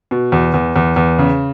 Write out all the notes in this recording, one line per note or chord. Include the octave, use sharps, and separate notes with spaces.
B2
E2
E2
E2
E2
C#3